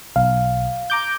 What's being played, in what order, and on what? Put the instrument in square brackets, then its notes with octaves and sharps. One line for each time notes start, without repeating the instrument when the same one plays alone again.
[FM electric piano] B1 [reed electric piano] F5
[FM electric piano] A#5 D6 G6